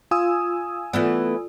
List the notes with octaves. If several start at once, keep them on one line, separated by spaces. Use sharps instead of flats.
F4 G#5 D#6 E6
E3 A3 B3 F4 A4 D5